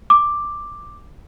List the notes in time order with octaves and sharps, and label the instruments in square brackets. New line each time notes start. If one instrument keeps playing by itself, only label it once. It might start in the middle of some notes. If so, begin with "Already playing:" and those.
[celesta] D6